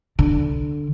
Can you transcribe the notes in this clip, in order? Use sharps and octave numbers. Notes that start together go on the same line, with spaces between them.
D3